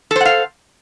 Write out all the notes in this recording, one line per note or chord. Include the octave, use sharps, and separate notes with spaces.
A4 C5 F5 F#5